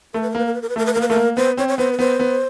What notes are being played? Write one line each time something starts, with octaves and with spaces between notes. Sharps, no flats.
A3 A#4
B4
A#4
A#3 B4
A#4
B4
A#4
B4
A3 A#4
B4
A#3 A#4
B4
A3 A#4
A#3
B3 C5
C4 C#5
C#5
B3 C5
B4
B3 C5
B3